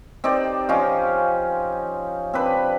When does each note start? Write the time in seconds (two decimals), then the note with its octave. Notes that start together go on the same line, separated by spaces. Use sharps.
0.24 C4 D#4 G4 D5
0.69 F3 C#4 D#4 F4
2.34 C4 D4 B4